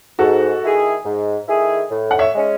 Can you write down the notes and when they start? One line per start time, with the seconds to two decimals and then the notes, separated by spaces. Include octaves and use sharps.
0.19 G#2 F#4 A4
0.62 D#3 A3 E4 G#4
1.05 G#2
1.48 D#3 A3 E4 G#4
1.91 A2
2.11 F#5
2.19 C#5 E5
2.34 G#3 C#4